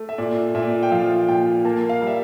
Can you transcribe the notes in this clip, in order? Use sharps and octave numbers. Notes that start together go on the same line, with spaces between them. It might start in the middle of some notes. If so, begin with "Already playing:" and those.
Already playing: A3
E5
A#2 D5
A#2 E5
D5
E5
G5
F3 F5
A#2 G5
A#3 A5
F5
G3
E5